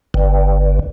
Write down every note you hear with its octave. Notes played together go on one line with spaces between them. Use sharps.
G1